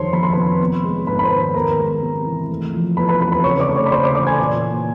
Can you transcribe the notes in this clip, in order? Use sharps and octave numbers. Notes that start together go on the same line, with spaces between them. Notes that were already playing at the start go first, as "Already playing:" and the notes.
Already playing: F2 D3 D#3 G3 C5 C#5 C6
F2 B5
C6
C3 B4 B5
B3
G#3
G#2 B4 B5
B5
C5 C6
D#3
B3 A#4 A#5
G#3
C3
E3
A3
F3
E2 B4 B5
B4 B5
C3 B4 B5
B4 B5
C#3 C#5 C#6
D5 D6
A3
C#5 C#6
B5
C#3 C5 C6
D5 D6
E3 D5 D6
G#5 G#6
A#2
A#3